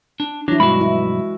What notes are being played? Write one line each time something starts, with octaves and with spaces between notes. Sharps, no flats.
D4
E3 F#3 D4 E4
B1 G2 G#3 F#4 B5
E4